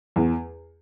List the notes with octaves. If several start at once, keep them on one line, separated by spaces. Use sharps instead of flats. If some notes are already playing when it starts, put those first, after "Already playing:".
E2